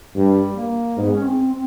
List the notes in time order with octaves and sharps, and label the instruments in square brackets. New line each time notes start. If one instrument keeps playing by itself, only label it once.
[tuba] G2 [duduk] G3
[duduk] A#3
[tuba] G#2 [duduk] B3
[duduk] C#4
C4
C4